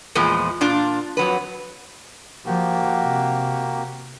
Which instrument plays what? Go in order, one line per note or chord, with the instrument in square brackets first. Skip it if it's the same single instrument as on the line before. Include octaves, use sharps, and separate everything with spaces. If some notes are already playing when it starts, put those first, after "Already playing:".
[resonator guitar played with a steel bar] E2 A#2 F3 G#3
A#2 D4 F4
F2 F#3 B4
[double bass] F3 [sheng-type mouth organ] A#3 F#4 G4
[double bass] C3